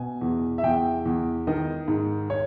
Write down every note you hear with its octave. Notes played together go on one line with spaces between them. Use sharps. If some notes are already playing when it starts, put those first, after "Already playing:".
Already playing: B2 G#5
E2
E5
E2 G5
E2
D#3 D#5
G#2
C#5